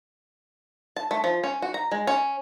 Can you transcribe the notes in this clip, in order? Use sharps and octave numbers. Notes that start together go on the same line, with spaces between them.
A5
A3
F3
C#4
F#4
A#5
G#3
C#4